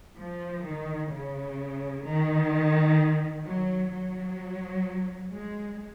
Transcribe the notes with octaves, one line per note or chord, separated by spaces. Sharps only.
F3
D#3
C#3
D#3
F#3
F#3
G#3